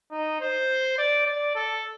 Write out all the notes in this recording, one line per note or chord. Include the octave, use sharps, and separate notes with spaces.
D#4
C5
D5
D5
A4